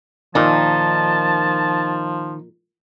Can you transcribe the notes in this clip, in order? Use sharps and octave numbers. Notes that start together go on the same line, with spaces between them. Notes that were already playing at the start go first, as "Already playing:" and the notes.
A#2 D#3 F3 D#4 A5